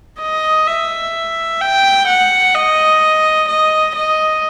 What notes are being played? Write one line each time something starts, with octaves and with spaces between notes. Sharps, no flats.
D#5
E5
G5
F#5
D#5
D#5
D#5